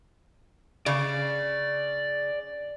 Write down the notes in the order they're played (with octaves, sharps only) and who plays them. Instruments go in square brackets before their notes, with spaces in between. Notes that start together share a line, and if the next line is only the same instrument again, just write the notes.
[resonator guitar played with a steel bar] C#3 [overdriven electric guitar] D5